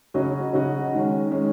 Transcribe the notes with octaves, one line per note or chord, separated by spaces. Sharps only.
C#3 F#3 C#4 F#4 D#5
C#3 F#3 C#4 F#4 D#5
D#3 G#3 C#4
D#3 G#3 C#4